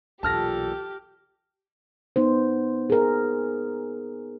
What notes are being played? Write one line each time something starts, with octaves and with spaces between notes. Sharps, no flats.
B1 E2 A#2 G4 A4 A5 F6 A#6
B3 D#4 C5
G#4 A#4